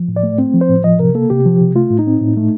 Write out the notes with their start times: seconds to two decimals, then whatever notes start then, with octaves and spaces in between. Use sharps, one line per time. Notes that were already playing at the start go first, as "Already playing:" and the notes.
Already playing: F3
0.08 A2
0.16 D5
0.23 A3
0.38 C4
0.54 F3
0.61 C5
0.69 A2
0.84 F3 D#5
0.99 C3 A#4
1.15 A#3 A4
1.30 C3 G4
1.46 F3
1.61 C3
1.75 A3 F4
1.91 A2
1.99 D#4
2.07 C4
2.22 A2
2.37 A3